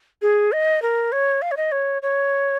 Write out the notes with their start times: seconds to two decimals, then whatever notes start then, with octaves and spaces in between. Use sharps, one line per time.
0.22 G#4
0.52 D#5
0.82 A#4
1.12 C#5
1.42 F5
1.51 C#5
1.57 D#5
1.72 C#5
2.02 C#5